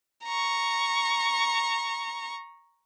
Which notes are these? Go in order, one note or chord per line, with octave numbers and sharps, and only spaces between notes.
A#5 C#6